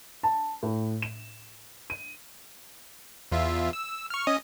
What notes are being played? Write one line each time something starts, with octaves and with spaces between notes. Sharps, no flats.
A5
A2
E7
D#7
E2 F4 E5
E6
C#6 F6
C#4 D#5 D#6